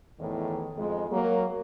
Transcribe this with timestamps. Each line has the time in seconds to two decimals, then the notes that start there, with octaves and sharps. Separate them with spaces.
0.19 E2 A2 D#3
0.77 F2 G#2 G#3
1.11 F#3 A#3